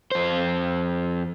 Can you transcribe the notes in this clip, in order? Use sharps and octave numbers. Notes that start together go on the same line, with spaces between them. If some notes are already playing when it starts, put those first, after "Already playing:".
F2 C5